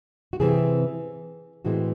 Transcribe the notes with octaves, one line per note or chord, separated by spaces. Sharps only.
F#4
C3 E3 C4 G#4
A2 E3 G#3 C4 F#4